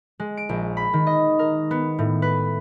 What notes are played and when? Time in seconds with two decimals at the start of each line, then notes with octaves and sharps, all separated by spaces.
0.20 G#3
0.37 D7
0.49 A#1
0.77 B5
0.93 D#3
1.07 D#5
1.39 A#4
1.71 B3
1.98 A2
2.22 B4